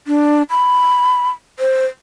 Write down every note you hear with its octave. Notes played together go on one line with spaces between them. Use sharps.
D4
B5
C5